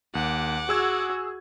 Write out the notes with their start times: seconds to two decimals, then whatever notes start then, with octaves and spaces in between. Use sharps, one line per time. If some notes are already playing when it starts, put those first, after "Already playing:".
0.15 D#2 F#5 D6
0.69 F#4 G#4 E6 G#6